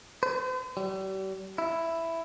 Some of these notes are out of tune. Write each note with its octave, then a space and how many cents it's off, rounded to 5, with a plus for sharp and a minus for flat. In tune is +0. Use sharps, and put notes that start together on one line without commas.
C5 -45
G3 -40
E4 +5